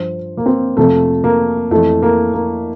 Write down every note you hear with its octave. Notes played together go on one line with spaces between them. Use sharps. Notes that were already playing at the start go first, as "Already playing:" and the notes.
Already playing: G2 F3 C5
A#3
C4
F2 C3 F3 A3
A#3
F2 E3 A3
A#3
A#3